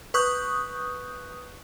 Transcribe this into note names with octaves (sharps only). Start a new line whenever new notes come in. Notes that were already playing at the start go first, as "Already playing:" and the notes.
B4 C#6 D#6 F#6 G6